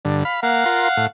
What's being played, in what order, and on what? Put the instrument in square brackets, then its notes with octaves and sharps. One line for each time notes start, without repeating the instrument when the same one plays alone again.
[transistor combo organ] G2 D3
F5 B5
[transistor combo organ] A#3 [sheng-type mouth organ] F5 F#5
[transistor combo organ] F4 A#4 C6
A2